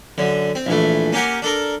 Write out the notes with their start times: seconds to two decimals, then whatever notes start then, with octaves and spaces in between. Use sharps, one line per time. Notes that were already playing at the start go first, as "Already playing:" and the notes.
0.18 F#2 D3
0.55 C4
0.66 A#1 E3 A3
1.12 A#3 C#4 G4 A#4 F#5
1.42 D4 A4 A#4